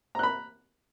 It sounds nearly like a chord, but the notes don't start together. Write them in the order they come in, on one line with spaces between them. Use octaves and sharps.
A#5 F#6 B5